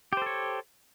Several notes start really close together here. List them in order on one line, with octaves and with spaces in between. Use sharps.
G4 C5 A4 C#5